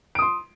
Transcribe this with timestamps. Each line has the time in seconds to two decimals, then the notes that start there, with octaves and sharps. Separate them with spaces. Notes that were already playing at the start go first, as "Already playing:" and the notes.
0.15 D7
0.19 D#6
0.22 C6